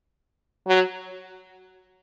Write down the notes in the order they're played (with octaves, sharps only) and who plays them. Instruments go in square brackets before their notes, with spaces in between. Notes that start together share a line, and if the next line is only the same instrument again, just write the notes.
[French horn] F#3